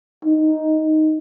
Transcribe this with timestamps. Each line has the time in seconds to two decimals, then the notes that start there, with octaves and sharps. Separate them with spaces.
0.25 D#4